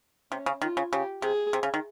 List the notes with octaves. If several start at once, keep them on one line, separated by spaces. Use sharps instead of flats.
C3 C#4
C#3
D#3 F4
C#3
C#3 G4
C3 G#4
C3
C#3
D#3